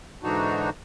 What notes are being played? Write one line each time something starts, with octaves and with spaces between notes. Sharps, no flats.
G#2 D3 E3 D4 D#4 F#4